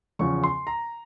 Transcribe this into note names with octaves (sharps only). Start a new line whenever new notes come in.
E2 C#3 F3 C#6
C6
A#5